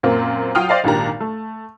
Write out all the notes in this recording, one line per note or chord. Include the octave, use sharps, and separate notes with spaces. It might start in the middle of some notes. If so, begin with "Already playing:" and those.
F#2 A#2 A#3 C4
F#3 F4 G5 D#6 F6
C5 D5 D#5 F5 G5
G#1 A#2 D#3 D4 G4 A#5
A3